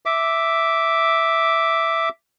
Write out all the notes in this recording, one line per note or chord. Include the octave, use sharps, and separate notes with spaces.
E5 D6